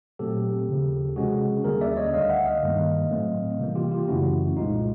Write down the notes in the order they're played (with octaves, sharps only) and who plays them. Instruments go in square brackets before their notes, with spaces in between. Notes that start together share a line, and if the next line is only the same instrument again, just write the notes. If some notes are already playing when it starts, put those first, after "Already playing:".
[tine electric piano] A#2 F#3 A3 C4 G4 A4
D#2 C#3 F3
C3 F3 G#3 C#4 F#4 G#4
D#2 D3 G3 A#3 C#4 G#4 A#4
D5 E5
C#5 D#5
D2 D3 G3 D#5 F5
E5 F#5
D#5 F5
G2 D#3 G3 A#3
A2 F#3 A3 C4
C3 E3 G3 A#3
F4 G4
F4 G4
F#2 C#3 E3 A3 C#4 E4 F#4
C2 A#2 F3 G#3 D#4 F4